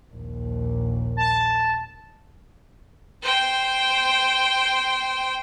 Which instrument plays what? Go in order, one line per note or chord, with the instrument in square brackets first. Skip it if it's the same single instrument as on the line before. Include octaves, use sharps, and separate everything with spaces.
[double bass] A#1 D#2
[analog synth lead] A5
[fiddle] C5 G5